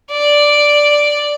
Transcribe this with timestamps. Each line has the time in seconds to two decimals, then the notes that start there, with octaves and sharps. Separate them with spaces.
0.11 D5